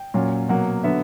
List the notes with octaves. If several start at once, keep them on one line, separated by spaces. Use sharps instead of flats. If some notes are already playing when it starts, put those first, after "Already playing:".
Already playing: G5
A#2 F#3 C#4
B2 F#3 A#3 F#5
D3 F#3 B3 D4 E5